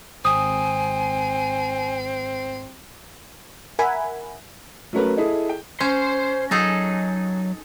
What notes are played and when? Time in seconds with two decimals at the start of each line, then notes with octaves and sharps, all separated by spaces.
0.25 G#1 C4 G#5 D#6
3.79 A#4 E5 F#5 G#5 B5
4.93 F#3 A3 C#4 A#4 B4
5.17 E4 G#4 A4 D#5
5.49 G5
5.80 C#4 C5 C6
6.51 F#3 D#4 G#4 A4